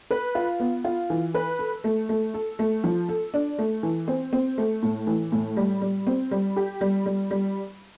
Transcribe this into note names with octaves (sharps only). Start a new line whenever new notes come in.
B4
F4
B3
F4
E3
B4
A4
A3
A3
A4
A3
F3
A4
D4
A3
E3
C4
C4
A3
A2
E3
A2
G3
G3
C4
G3
G4
G3
G3
G3